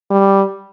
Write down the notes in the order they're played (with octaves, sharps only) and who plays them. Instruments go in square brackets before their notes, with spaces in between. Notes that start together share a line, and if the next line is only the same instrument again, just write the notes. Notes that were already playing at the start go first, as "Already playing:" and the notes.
[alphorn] G3